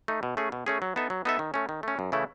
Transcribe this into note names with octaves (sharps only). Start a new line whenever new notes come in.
A3 D#4
B2
A3 C#4 G#4
B2
A3 C#4 G#4
F#3
B3 D#4 A4 E5
F#3
B3 D#4 A4 E5
D#3
A3 C#4
D#3
A3 C#4
F#2
C#3 E3 A3 E4